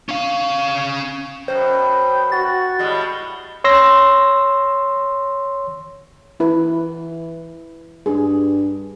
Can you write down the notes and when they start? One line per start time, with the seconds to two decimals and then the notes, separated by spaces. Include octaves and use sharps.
0.09 C#4 F5
1.48 F#2 B2 C5 G5
2.32 F#4 A6
2.79 A2 G3 G#3 D#5
3.64 C#5 C6 E6 A#6
6.40 E3 E4 B4
8.06 G2 G#4